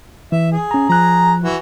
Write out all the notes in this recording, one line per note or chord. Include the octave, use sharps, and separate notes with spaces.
E3 E5
G#4
C#4 A#5
F3 G#4 A#5 F#6
E3 F#4